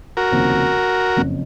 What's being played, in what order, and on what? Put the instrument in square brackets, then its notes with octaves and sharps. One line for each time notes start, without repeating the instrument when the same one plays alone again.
[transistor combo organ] F#4 A#4
[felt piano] F1 D#2 C#3 F3 C4
F#1 F2 C#3